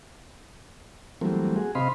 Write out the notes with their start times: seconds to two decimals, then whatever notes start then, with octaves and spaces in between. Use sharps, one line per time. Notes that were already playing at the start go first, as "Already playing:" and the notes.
1.21 E3 F#3 G3 A3 A#3 C4
1.56 F#4 G#4
1.75 C3 C4 D#5 F5 B5 C6